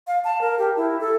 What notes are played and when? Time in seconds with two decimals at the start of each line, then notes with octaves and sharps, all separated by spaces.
0.07 F5
0.24 A5
0.41 A#4
0.59 G4
0.76 E4
1.01 A4